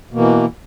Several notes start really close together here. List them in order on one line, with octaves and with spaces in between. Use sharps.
B2 A#3 E3